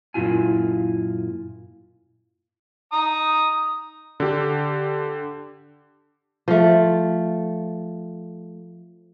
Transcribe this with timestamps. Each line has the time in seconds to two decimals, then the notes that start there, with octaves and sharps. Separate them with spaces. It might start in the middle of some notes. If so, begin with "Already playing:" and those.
0.14 F#2 A#2 C#3 E4 F4 G#5
2.93 A#5 D#6
4.20 D3 G4
6.48 F3 A3